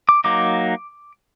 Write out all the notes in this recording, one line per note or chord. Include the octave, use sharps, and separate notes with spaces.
D6
F#3 A#3 D#4 D6